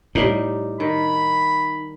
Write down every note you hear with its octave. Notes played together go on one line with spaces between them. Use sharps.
A2 G3 D#4
D#3 B5